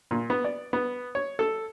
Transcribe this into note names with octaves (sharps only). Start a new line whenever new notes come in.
A#2
B3
D5
B3
C#5
A4